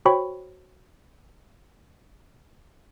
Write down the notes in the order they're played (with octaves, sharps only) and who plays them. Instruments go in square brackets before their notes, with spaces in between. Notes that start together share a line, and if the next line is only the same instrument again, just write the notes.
[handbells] F#4 C5 C#5 G5 B5 C#6